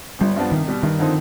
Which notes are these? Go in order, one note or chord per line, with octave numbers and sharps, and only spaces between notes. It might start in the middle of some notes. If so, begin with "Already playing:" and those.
G1 G3
G2 F3 B3 D4
C2 D#3
B2 G3
G2 D#3
D3 F3 C4 D#4